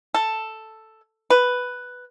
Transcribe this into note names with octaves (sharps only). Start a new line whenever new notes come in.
A4
B4